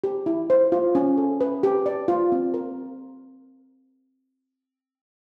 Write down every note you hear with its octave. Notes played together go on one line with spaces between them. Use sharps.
G4
E4
C5
F4
C#4
A4
B4
G4
D5
F4
C4
A#4